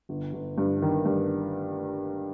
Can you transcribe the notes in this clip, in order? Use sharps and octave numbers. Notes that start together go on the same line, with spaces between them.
G1
G1
G2
D#3
G2